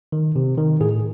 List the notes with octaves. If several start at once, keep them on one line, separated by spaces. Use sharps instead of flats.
D#3
C3
D#3
A2 G#4